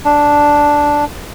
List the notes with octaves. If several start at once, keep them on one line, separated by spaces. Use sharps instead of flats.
D4